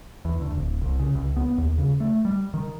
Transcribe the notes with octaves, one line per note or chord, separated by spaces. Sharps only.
E2
D2
D1
C2
C#3
C#2
B3
D#2
C#3
A3
G3
D#3